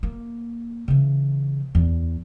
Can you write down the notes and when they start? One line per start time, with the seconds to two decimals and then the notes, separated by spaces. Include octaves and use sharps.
0.03 A#3
0.88 C#3 E3
1.75 E2